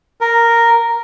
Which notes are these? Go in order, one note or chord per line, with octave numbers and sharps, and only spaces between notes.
A#4